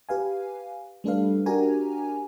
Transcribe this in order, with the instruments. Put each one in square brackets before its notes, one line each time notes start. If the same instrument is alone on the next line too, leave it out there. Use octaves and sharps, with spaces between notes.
[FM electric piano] G4 B4 F5 G#5
G3 A3 D4 A4 B4 F5
D4 F#4 G4 A#4 G#5 A#5